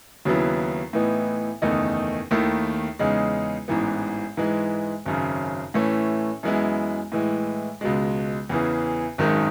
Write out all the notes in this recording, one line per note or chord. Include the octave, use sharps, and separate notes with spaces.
D#2 C#3 F#3 B3 E4
A2 E3 B3 D#4
F#1 E2 D#3 A3 D#4
D#2 D#3 A3 E4
E2 C#3 G#3 D#4
A1 G#2 E3 B3
G#2 E3 G#3
G#1 F#2 C#3
A2 E3 A3 C#4
F#2 E3 G#3 B3 E4
A2 E3 G#3
C#2 B2 G#3
E2 C#3 E3
G#1 F#2 D#3 G#3 D#4